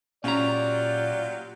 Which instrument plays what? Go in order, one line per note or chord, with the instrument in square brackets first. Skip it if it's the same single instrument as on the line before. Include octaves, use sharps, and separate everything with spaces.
[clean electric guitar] A#2 A#5 [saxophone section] F#3 F4 G4 [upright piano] C#4 [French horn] D5